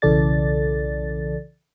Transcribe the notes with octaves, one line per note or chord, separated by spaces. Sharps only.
B1 C#3 E3 A4 D5 A6